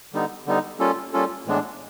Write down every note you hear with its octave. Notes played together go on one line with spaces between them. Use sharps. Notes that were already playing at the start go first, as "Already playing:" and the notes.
D3 G3 B3 D#4
D3 G3 B3 D#4
G3 A#3 C#4 F4 A4
G3 A#3 C#4 F4 A4
A2 E3 G#3 B3 D4